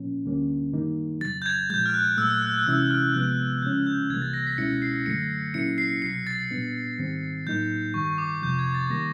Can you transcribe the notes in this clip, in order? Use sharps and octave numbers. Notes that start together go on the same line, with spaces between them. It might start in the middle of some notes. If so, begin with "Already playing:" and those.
Already playing: A#2 F3 A#3 C#4
D2 D3 G3 A#3 C#4
F#2 D#3 G3 A#3 D#4
F2 C#3 F#3 A6
G6
G#6
A#2 F3 G#3 G6
F6
F#6
A#2 F#3 A3 E6
E6
F#6
F#6
C3 E3 G#3 C#4 E4 E6
F6
C3 F3 G#3 B3 F#6
C#3 F3 G#3 C#4 G6
G6
C2 C3 E3 G3 A#3 G#6
A6
A#6
B6
C#2 B2 G#3 C#4 E4 C#7
C7
F#2 D3 F#3 A3 C#7
A#2 F#3 A#3 C#4 E4 C#7
C7
C2 B2 F#3 C7
A6
A#2 G3 B3 D4
G#2 D#3 G3 C4
A2 F#3 A#3 D#4 G6
G2 D#3 G3 C#6
D6
F2 C3 F3 G6
G#6
A6
D#3 G3 A#3 A#6